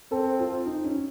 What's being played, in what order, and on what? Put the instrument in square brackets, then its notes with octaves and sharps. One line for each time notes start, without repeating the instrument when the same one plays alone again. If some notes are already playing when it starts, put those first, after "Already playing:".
[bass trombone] C4 [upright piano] A4
[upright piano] F4
D#4
C#4